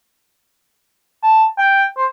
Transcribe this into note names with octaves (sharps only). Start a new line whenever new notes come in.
A5
G5
C5